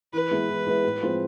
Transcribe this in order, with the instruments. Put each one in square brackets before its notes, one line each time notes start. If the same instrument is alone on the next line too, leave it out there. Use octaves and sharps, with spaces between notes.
[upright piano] E3 [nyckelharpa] B4
[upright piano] G#3 B3 E4
E3
G#3 B3 E4
A2
F3 G#3 C4 F4